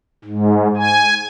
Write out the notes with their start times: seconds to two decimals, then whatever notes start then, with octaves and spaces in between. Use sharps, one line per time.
0.25 G#2
0.77 G#5